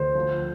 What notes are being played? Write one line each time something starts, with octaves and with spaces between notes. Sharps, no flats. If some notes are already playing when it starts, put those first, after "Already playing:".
Already playing: D2 C5
F3